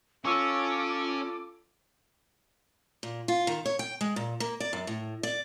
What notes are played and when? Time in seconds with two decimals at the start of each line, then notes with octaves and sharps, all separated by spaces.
0.25 C#4 F4 A4 C#6 D6 E6 A#6
3.03 A#2
3.28 F4
3.47 D#3
3.65 C#5
3.79 G5
4.01 G#3
4.16 A#2
4.40 A#3
4.60 D5
4.73 F#2
4.87 A2
5.23 D5